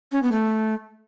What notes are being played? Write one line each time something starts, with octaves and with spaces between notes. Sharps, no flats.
C#4
B3
A3